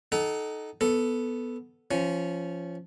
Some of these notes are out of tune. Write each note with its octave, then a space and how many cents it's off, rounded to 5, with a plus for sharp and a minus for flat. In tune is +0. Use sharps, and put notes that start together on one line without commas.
D#4 +0 A4 -15 F#5 +25
B3 +0 A4 +0
F3 -15 C#4 +0